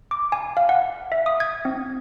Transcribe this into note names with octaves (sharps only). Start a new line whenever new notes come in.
D6
G#5
F5
F#5
E5
D#6
G#6
C4